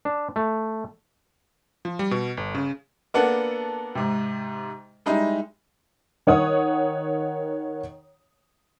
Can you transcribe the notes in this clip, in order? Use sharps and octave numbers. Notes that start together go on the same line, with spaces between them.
D4
A3
F3
G3
B2
G1
C#3
A#3 B3 D4 A4 F#5
G#2 C3
G3 G#3 D#4 E4
D#3 C#5 F#5 D#6